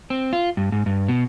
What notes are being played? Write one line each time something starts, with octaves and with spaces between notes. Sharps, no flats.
C4
F4
G2
G#2
G2
B2